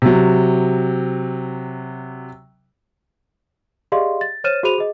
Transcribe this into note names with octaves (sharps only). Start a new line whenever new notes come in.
C3 F#3
G4 G#4 D5 D#5 F5 C6
A6
C5 C#5 F6 A6 D#7 E7
F#4 G#4 C5 B5 D#7 F7
G#4 D#5